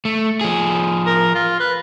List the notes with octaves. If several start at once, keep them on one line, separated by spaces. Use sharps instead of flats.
A3
F3 G#4
A#4
F4
B4